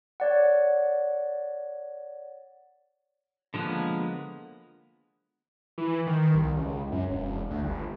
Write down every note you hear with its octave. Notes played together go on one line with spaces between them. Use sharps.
C#5 D5 F#5
D3 F3 G#3 A#3 B3
E3
D#3
C2
C#2
F#2
E1
D2
G1